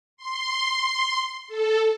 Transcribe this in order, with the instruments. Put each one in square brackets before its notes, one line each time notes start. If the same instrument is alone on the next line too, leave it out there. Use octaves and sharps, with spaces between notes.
[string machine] C6
A4